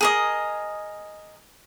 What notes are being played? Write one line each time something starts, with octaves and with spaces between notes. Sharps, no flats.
G#4 A#4 D#5